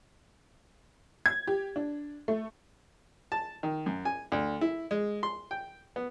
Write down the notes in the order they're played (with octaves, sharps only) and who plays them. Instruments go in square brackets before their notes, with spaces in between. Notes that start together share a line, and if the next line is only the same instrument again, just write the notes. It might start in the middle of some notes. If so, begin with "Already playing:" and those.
[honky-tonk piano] G#6
G4
D4
A3
[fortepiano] A5
D#3
F#2
G#5
D2
E4
G#3
C6
G5
B3